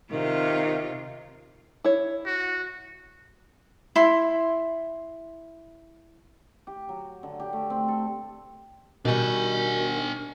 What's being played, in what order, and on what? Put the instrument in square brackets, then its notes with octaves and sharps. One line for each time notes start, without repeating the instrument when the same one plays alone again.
[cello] C3 F4 [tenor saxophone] D#3
[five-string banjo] E4 C#5
[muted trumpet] F#4
[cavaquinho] E4 C6
[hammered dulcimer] G4
F#3
D3
G4
A3
C4
A4
[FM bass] B2 [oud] D#3 G3 [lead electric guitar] D4 G#5 [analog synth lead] F#4